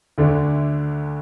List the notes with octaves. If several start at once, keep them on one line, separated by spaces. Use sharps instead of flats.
D2 D3 A3 D4